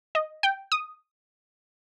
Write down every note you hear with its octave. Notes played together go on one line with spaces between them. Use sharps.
D#5
G5
D#6